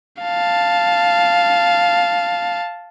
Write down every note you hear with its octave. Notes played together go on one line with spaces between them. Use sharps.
F5 A5